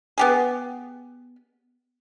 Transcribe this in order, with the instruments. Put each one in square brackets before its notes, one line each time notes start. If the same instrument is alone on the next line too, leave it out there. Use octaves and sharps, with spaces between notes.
[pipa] B3 G4 G#4